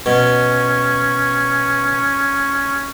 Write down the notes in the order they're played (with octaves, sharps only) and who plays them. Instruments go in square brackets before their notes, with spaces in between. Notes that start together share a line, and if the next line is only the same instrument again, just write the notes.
[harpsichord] B2 [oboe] C#4